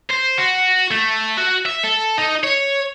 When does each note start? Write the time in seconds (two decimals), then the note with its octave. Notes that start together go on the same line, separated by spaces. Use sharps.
0.10 C5
0.38 F#4
0.91 A3
1.37 F#4
1.66 E5
1.83 A4
2.18 D#4
2.44 C#5